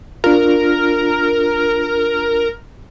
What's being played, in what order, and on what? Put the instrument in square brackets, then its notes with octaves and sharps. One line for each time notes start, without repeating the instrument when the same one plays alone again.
[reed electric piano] D4 F4 [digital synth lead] A#4